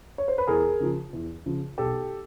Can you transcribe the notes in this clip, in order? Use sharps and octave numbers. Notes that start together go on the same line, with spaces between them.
C#5
C5
B4
E2 G#4 A#4
C#3 F3
E2
C#3 F3
B1 G4 A4